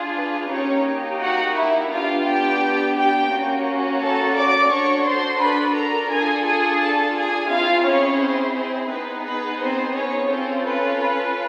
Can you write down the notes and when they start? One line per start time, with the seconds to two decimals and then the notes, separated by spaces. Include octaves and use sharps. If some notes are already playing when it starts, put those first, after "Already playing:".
Already playing: D4 F4 G#4
0.17 B4
0.51 A#3 C#4 D#4 G4 C#5
1.21 F#4 F#5
1.57 E4 E5
1.91 B3 D4 F4 G4 F5
2.26 G4 G5
2.96 G4 G5
3.32 A#3 C#4 F#4
4.01 A4 A5
4.36 D5 D6
4.71 D4 F#4 A4 C#5 C#6
5.06 C5 C6
5.41 B4 B5
5.76 A#4 A#5
6.12 D4 F4 G#4 A4 G#5
6.46 G#4 G#5
6.81 A4 A5
7.16 G#4 G#5
7.51 C4 E4 F4 G#4 F5
7.86 C#4 C#5
8.21 C4 C5
8.56 C4 C5
8.91 B3 D#4 G#4 B4
9.26 B4
9.62 C4 C5
9.96 C#4 C#5
10.31 C4 C#4 F4 A4 C5
10.66 B4
11.01 B4